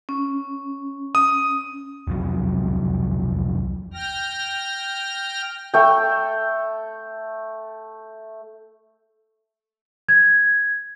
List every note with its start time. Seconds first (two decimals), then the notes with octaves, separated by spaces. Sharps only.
0.09 C#4
1.15 D#6
2.07 E1 C2 F2 F#3
3.94 G5 F6 A#6
5.74 A3 G5
10.09 G#6